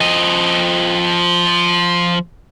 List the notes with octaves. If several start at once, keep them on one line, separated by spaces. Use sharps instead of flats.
F3 D#5